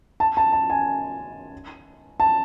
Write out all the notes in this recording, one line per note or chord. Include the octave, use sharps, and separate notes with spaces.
A5
A5
A5
G#5
A5